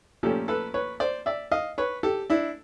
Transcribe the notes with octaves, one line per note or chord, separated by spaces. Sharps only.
A#2 F3 A3 C#4 G4 A4
A4 B4
B4 C#5
C5 D5
D5 E5
D#5 F5
B4 C#5
G4 A4
D4 E4